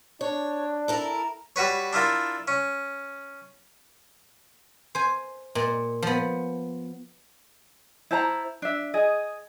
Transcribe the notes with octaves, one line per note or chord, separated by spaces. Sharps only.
D4 C#5
E4 A4 A#4
G3 F#4 B4 C#5
D4 E4 F4 A#4
C#4
C5 G#5
A#2
F3 B3
E4 C5 A5 A#5
D4 E5
G#4 D#5